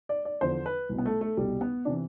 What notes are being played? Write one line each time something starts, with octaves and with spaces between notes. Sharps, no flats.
D5
D5
E2 D3 F3 C5
B4
C2 B2
B3
A3
A3
C2 B2 G3
B3
C3 E3 D4